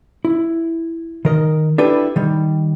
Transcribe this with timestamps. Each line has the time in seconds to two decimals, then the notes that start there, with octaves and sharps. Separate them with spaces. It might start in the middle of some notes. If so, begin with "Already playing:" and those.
0.25 E4
1.25 D#3 A#4 D#5
1.78 D4 E4 G4 A4 B4
2.16 D#3 G3